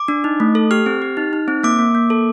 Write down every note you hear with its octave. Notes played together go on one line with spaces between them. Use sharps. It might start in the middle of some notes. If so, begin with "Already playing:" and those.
Already playing: D6
D4
D#4
A3
A4
G4 F6
C4
G4
D#4
D#4
C4
A#3 D6
A#3
A#3
A4